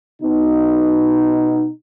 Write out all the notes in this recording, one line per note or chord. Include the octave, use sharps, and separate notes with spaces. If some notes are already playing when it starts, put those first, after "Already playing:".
B2 D#4